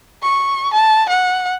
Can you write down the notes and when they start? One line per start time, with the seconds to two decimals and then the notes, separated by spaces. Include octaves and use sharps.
0.23 C#6
0.74 A5
1.09 F#5